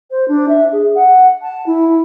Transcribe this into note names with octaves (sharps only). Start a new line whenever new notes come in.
C5
D4
E5
G#4
F#5
A5
E4